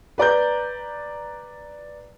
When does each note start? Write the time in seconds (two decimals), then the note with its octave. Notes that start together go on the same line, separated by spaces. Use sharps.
0.18 B4 D5 A#5 G6